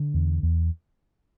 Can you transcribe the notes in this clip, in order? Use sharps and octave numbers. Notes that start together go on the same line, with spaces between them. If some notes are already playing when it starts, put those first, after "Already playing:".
Already playing: D3
E2
E2